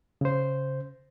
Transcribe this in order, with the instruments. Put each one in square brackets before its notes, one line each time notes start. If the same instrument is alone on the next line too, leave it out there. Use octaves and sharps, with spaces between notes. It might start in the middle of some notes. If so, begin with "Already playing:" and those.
[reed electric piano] C#3 C5